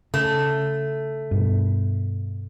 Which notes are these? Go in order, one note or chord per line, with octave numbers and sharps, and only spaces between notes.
C#3 A3
G2 B2